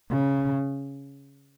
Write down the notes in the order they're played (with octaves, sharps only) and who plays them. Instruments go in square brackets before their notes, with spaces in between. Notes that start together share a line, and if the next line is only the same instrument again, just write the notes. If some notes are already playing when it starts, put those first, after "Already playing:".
[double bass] C#3